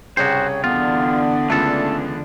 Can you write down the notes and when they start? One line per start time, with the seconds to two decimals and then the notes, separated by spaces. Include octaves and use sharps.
0.17 C2 C#3 F#4 C5 C#5 G5
0.64 D3 E3 B3 D4 F4
1.50 C#2 A3 B3 C#4 A4 A5